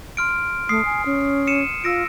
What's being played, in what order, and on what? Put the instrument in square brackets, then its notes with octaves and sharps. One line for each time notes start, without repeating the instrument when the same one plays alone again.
[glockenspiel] C6 F6 D7
[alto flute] A3 [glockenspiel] D#6 C7
[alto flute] G#5
C#4
[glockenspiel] C#7 D#7 E7
[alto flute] F4 [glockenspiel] E6 A#6 D7